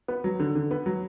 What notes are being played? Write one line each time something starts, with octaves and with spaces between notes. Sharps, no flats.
B3
F#3
D3
D3
B3
F#3